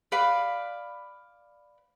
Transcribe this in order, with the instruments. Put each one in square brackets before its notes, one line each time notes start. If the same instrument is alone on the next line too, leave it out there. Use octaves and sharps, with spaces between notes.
[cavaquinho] B4 D5 F5 B5